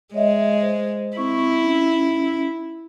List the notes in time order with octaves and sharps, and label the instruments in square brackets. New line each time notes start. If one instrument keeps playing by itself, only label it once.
[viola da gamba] G#3 [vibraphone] C#5 D#5 E5
[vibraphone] C5
[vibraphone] C4 C#6 [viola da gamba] E4
[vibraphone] C#4 D#4